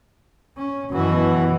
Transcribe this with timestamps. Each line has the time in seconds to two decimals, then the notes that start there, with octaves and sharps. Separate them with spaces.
0.57 C#4
0.91 F#2 B2 E3 F#4